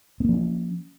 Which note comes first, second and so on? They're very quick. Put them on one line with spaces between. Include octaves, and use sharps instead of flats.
B3 A#3 F3 C#4